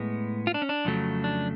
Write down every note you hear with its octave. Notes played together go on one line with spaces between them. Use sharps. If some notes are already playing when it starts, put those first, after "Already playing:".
Already playing: A2 G#3 B3
F4
D4
C#4
D4
F2 C#3 F#3 A3
D4